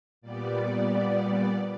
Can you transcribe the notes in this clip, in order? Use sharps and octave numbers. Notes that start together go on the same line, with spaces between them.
A#2 G3 B3 D5